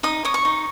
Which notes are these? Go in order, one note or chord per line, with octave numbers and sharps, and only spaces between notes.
D#4 D#6
C#5 D#6
C#6
D#4